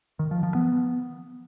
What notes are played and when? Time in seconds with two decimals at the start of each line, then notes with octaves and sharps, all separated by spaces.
0.19 D#3
0.31 F3
0.43 F3
0.55 B3